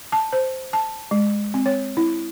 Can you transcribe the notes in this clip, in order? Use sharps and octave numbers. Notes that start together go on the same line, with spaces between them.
A5
C5
A5
G#3
C4
C#5
E4